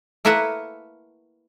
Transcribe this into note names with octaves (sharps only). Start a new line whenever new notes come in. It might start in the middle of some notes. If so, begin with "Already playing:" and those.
A3 A#3 E4 A#4 B4 F#5